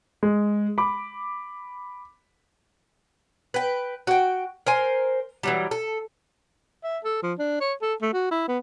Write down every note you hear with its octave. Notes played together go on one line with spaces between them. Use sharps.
G#3
B5 D6
B4 G5
F#4 G5
A#4 C5 G#5
E3 F#3 G3
A4
E5
A4
F3
D4
C#5
A4
A3
F#4
E4
B3